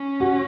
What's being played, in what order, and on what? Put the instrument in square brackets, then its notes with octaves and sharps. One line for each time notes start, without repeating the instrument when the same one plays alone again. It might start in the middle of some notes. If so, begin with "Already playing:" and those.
Already playing: [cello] C#4
[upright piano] F#4